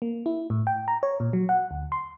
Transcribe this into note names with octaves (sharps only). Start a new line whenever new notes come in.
A#3
E4
A2
G5
A#5
C#5
A#2
F#3
F#5
D2
C6